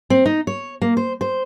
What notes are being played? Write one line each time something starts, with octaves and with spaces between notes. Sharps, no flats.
C4
D#4
C#5
A#3
C5
C5